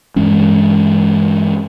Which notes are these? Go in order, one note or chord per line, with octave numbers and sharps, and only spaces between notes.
G2 E3 G#3 C#4